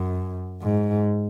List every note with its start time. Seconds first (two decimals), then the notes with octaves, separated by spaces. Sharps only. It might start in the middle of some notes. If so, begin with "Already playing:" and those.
Already playing: F#2
0.62 G#2